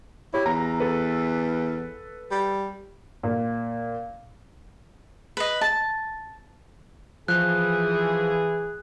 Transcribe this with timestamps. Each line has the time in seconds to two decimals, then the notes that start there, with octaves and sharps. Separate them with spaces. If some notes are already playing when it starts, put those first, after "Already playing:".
0.34 E4 G4 C#5
0.46 E2 A#5
0.80 A4 B4
2.31 G3
3.23 A#2
5.37 B4 D#5
5.61 A5
7.28 E3 F3 G#4 F#6